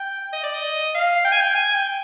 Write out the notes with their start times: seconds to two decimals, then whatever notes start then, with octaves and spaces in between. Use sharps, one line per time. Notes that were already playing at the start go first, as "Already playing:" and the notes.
Already playing: G5
0.33 D#5
0.43 D5
0.54 D#5
0.94 F5
1.25 G5
1.32 G#5
1.41 G5
1.55 G#5
1.75 G5